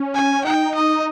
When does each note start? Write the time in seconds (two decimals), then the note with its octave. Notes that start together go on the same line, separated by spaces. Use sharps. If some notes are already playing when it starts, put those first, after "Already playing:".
Already playing: C#4
0.14 G#5
0.45 D#4 G5
0.75 D#5